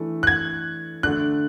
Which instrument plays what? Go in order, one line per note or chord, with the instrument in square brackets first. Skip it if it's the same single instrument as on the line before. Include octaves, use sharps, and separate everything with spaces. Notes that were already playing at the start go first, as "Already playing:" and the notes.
Already playing: [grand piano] E3 A3 D4
[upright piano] F#6
G#6
[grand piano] D3 A3 D4 [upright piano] F#6